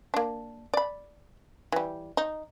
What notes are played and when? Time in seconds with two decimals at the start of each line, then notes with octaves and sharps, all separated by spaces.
0.14 A#3 D4
0.74 D5 B5
1.72 E3 G3
2.17 D#4